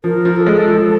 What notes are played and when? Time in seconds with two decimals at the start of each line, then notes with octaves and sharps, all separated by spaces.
0.04 F3 A#4
0.25 F3
0.36 A4
0.46 G#3
0.68 F3